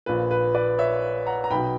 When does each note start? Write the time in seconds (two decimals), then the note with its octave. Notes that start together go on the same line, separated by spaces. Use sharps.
0.06 A#1 A#2 B4
0.31 B4
0.54 B4 D5
0.78 C#5 E5
1.27 F#5 A#5
1.44 A#5
1.51 B1 B2 G5 B5